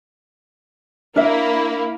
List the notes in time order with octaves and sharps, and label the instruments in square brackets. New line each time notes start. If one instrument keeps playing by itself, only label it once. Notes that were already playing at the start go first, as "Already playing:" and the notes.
[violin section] A#3 E4 [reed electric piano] D4 [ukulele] A#4 E5